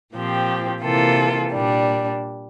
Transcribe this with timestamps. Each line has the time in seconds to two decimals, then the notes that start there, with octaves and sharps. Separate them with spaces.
0.13 A#2 F3 C4 G4
0.82 C3 E3 A#3 F4 A4
1.52 A#2 G3 D4